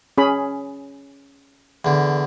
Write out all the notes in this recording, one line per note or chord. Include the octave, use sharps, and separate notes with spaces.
C#4 G#4 B5
E2 D3